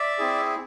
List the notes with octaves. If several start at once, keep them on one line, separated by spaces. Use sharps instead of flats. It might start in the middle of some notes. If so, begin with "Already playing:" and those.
Already playing: D5 E5
C4 E4 G#4